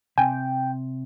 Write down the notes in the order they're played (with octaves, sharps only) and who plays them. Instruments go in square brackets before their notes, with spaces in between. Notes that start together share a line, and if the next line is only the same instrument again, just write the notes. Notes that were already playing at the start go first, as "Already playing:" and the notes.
[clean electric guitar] C3 [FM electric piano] G5 [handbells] G#5